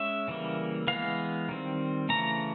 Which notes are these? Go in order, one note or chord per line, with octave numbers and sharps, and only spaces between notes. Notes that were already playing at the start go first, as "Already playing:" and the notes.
Already playing: G#3 C#4 E5
C#3 E3 G3 A#3
E3 G#3 B3 F5
D#3 G3 C4
C#3 E3 A3 C#4 A#5